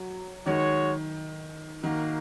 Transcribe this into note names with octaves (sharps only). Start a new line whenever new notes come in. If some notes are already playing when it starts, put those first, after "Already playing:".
Already playing: F#3
D#3 G#3 F#4 C#5
D#3 A#3 F#4 A#4 F#5